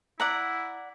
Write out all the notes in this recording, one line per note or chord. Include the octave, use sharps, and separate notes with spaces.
E4 D5 F#5 A#5